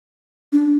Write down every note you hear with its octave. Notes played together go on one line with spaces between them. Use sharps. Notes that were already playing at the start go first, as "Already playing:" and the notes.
D4